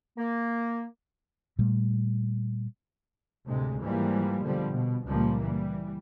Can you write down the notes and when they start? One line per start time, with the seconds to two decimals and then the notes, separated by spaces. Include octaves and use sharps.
0.18 A#3
1.59 A#2 G3 A3
3.46 D2 A2 C3 G#3
3.82 G#2 E3 F3 G3 G#3 A#3
4.42 B2 D3 F3 G3
4.72 B2
5.07 C#2 A#2 F3 G3 A#3
5.41 E3 G3